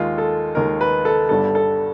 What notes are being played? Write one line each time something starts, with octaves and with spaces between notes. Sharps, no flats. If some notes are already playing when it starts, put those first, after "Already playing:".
Already playing: D#2 D#3 G#3 F4
A4
D#2 D#3 G#3 A#4
B4
A4
G1 G2 D3 G3 A4
A4